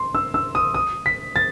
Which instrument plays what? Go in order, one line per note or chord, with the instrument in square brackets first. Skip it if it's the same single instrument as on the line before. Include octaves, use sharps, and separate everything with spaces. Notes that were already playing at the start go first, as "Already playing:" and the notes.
Already playing: [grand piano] C6
E6
E6
D#6
D#6
B6
A6